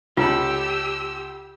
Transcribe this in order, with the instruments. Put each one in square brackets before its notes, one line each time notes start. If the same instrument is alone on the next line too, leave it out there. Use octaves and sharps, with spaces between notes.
[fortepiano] C#2 A4 B5 [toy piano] F4 [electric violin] G4 E6